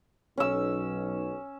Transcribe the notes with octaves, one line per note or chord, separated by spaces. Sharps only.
B1 C#4 E6